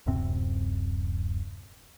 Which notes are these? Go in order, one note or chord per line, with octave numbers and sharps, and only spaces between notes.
D1 F#2 C3 C4